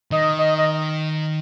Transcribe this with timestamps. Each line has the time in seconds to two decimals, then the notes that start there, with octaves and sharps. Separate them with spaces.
0.11 D#3 D#5
0.38 D#5
0.58 D#5